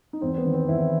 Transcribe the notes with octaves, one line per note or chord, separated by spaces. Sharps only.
D#4
E2 C4
B3
D#3
C4
E2 E4